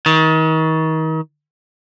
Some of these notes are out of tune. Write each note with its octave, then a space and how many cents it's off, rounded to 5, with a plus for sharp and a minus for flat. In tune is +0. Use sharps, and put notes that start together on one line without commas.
D#3 +35